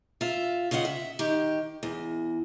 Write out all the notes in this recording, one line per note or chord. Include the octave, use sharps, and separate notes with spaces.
F4 E5
C#3 F4 D#5 F5 F#5
E5
D#3 G4
E2